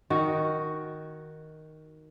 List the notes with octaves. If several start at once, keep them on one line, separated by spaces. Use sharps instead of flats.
D#3 F#4